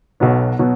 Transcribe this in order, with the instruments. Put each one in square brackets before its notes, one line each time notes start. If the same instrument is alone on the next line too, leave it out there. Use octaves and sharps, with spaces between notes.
[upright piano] B1 B2 F#3 B3
B2 F#3 B3